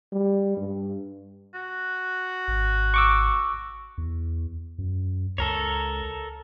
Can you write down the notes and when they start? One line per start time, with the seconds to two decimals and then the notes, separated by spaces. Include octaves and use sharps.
0.12 G3
0.57 G2
1.54 F#4
2.48 G#1
2.94 C#6 D6 E6
3.98 E2
4.78 F#2
5.38 C#2 A4 A#4 C#5